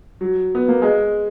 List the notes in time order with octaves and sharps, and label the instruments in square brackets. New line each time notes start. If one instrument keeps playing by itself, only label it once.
[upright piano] F#3
B3
A#3
G#3